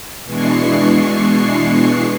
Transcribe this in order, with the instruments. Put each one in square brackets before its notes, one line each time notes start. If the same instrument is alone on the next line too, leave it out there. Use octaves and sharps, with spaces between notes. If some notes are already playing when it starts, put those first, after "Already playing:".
[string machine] B2 E3 G#3 D4 C#6 C7